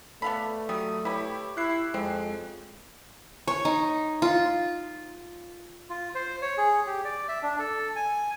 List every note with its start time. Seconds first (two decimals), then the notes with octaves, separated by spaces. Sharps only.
0.22 A3 B3 A4 D5 F5 B5
0.69 F#3 G3 D#6
1.05 E4 G4 B4 C#5 G5 B5
1.57 E4 F#6 C7
1.94 F2 G#3 C4
3.48 C#5
3.65 D#4
4.22 F4
5.90 F4
6.15 C5
6.42 C#5
6.58 G#4
6.87 G4
7.05 D5
7.29 E5
7.43 D4
7.59 A4
7.96 G#5